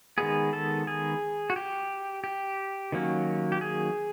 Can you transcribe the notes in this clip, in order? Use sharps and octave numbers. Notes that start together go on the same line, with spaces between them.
D#3 G#3 B3 G#4
A4
G#4
F#4
G4
G4
D#3 F#3 A#3 C#4
G4
G#4